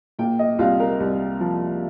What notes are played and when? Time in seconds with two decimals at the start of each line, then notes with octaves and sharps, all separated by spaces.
0.19 A#2 G5
0.39 D#5
0.59 C2 F4
0.80 A#4
1.00 C2
1.40 F3